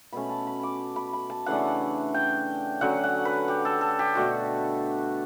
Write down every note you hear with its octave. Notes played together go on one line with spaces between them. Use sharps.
B2 A3 C#4 B5
A5
B5
D6
B5
B5
A5
C#3 E3 A3 D4 F#5
G5
D3 F#3 C#4 F#5
F#5
B4
G4
A4
A4
G4
B2 A3 D4 F#4